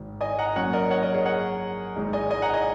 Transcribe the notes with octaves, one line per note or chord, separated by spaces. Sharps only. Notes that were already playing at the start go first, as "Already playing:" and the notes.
Already playing: G#1 G#2
D#5 G#5
F#5 A#5
F#2 F#3 A#3 C#4 C#5 F#5
A#4 D#5
C#5 F#5
A#4 D#5
G#4 C#5
C#5 F#5
G#1 G#2 G#3 D#4
D#5 G#5
D#5 G#5
F#5 A#5
D#5 G#5